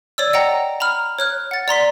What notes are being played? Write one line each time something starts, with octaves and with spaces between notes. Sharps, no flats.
C#5 D5 E6
D#5 F#5 G5 A#5
A#5 B5 F6
C#5 F6 F#6
F#5 A6
D5 A#5 C6 B6